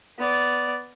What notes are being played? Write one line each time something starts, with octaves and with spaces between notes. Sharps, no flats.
B3 D5